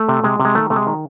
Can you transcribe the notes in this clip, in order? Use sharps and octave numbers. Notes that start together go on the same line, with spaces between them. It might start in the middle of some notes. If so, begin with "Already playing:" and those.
Already playing: A3
C3
C3 G#3
C3
G#3
D#3 A3
C3 A3
G#3
D#3